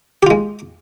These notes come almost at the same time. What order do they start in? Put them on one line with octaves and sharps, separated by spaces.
G4 F4 G#3